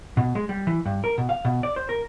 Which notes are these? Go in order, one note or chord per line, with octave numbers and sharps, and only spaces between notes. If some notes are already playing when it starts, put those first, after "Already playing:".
B2
G#3
G3
E3
G2
A#4
B2
F5
B2
D5
C5
A#4